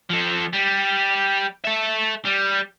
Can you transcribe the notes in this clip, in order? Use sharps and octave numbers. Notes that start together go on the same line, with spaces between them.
F3 A4
G3
A4 E5
G3